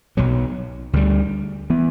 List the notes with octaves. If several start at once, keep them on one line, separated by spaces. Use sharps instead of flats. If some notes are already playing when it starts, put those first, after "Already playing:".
B1 B2 F#3
D2 D3 G3
E3 B3